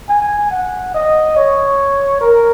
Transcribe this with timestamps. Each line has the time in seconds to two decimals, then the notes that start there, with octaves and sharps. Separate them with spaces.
0.09 G#5
0.51 F#5
0.94 D#5
1.37 C#5
2.21 A#4